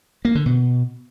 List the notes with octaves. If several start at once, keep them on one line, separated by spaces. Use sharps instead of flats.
A#3
D3
B2